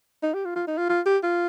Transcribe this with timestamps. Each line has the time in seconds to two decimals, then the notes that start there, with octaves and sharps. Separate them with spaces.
0.23 D#4
0.34 G4
0.45 F4
0.56 F4
0.68 D#4
0.78 F4
0.90 F4
1.06 G4
1.23 F4